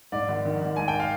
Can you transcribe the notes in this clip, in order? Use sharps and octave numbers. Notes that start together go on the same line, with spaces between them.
G#2 D5
G#1
D#3
G#1
G#2 G#5
G5
F5